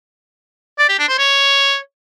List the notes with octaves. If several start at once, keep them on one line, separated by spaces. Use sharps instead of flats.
D5
G4
D4
C5
C#5